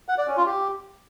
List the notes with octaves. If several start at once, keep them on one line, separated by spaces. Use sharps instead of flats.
F#5
D5
C#4
F4
G4